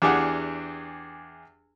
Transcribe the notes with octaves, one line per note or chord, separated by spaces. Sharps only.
E2 D4 G4 G#4 F#5